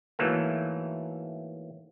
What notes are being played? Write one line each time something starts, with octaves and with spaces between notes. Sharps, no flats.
G#2 E3 F#3 A3 A#3